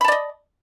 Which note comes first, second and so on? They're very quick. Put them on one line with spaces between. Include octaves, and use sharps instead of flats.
B5 A5 D5 D#5